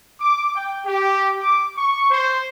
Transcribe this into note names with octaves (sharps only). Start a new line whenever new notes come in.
D6
G5
G4
D6
C#6
C5